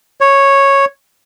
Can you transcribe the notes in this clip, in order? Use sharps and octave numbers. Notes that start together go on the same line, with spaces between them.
C#5